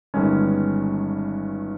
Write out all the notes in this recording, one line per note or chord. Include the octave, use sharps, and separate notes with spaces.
G1 G2 D#3 G#3 C#4